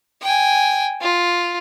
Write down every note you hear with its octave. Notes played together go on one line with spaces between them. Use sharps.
G5 G#5
F4